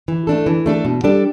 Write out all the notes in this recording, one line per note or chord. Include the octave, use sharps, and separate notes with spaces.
E3
A3 D4 A4
E3
A3 D4 A4
B2
G3 D4 A4 D5